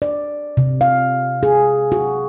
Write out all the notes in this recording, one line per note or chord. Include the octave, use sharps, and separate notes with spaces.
D5
C3
F5
G#4
F#4